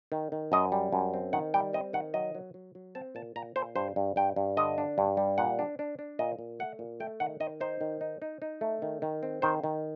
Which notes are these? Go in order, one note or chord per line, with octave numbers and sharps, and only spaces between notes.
D#3
D#3
F#2 D#5
G3
F#2
C4
D#3 F#5
G3 G5
C4 D#5
D#3 F#5
F#3 D#5
F#3
F#3
F#3
C4 A5
A#2 A5
A#2 A#5
A#2 C5
G2 C5
G2
G2 G5
G2
D3 D#5
D4
G2
G3
A#2 F#5
D4
D4
D4
A#2 D#5
A#2
A3 F#5
A#2
A3 G5
D#3 F#5
D#3 D#5
D#4 C5
D#3
D#4
D#4
D#4
A3
D#3
D#3
C4
D#3 C5
D#3